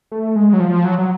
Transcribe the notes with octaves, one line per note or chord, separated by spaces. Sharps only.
A3
G#3
F#3
F3
F#3
F#3